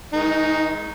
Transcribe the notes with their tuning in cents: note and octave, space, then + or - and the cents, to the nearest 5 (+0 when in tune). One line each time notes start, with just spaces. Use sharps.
D#3 +45 G#3 +5 D#4 +0